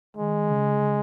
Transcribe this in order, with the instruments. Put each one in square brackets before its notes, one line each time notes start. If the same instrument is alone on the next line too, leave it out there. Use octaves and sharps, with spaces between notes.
[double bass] D#3 [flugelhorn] G#3
[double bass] C#3